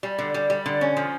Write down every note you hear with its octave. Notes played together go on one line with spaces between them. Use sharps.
G3
D3
G3
G3
D3
C#4
F3